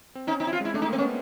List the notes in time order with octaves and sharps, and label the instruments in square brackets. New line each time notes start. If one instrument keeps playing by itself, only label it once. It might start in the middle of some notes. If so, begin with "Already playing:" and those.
[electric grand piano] C4
[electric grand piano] C#4 [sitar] D#4
[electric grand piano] C4 [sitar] D#4
[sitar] E4
F4
[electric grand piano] G#3 [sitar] E4
[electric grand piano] A3 [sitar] D4
[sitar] D#4
[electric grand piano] A#3 [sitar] C4
[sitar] C#4
[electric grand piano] B3